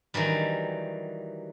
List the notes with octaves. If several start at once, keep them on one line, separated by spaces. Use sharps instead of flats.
D#3 E3 F#3 G3